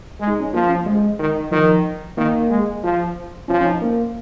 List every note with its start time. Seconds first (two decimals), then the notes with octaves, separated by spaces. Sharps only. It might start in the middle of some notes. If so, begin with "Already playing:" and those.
0.20 G#3
0.27 D#4
0.40 C#4
0.53 F3 A#3
0.69 C#4
0.86 G#3
1.19 D#3
1.51 D#3 F3
2.17 D#3 A#3
2.50 G#3
2.83 F3
3.48 F3 C#4
3.61 C#4
3.65 D#4
3.82 A#3